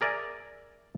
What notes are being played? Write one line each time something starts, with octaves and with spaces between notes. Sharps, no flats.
G#4 A#4 D5 E5 G#5